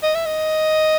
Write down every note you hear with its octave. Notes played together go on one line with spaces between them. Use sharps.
D#5
E5
D#5